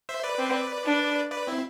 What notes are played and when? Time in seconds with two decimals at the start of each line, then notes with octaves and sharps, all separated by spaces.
0.09 C5 E5
0.23 B4 D5
0.39 C4
0.86 D4
1.32 B4 D5
1.47 C4 E4